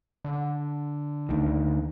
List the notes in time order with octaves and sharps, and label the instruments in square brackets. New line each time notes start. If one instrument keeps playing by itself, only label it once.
[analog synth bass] D3
[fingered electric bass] D2 D#3